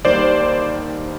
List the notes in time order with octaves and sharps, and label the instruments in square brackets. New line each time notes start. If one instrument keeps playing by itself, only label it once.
[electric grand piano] D#2 D#3 G3 C5 D5